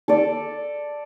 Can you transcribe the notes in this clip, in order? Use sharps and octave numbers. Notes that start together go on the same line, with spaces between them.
A4 D5